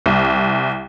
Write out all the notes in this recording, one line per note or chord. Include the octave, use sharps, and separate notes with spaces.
C2